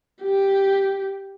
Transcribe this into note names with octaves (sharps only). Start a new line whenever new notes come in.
G4